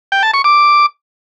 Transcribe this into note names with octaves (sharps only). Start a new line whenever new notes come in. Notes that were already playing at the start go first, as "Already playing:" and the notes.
G5
A5
C#6
D6